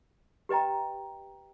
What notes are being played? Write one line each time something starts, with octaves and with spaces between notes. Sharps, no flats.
G4 B4 D#5 G5 A#5